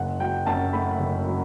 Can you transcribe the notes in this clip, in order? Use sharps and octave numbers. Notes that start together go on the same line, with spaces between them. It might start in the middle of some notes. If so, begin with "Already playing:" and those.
Already playing: F#1 F#5
F#3 G5
F#2 A5
A3 B5
F#1
F#3